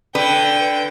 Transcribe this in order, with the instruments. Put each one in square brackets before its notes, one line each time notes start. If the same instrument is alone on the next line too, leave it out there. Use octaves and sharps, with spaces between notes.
[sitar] D3 [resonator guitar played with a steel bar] B4 [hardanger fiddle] G5